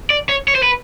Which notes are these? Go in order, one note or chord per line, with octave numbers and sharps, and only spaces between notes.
D5
C#5
C#5
C5
B4